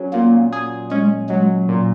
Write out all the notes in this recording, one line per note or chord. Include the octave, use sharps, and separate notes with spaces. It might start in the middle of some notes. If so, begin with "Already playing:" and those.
Already playing: F#3 C#4 G#4
A#2 A#3
G#4
G#3 C#4
F#3 G#3
A#2